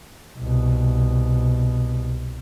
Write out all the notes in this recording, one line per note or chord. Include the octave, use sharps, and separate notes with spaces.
C2 B2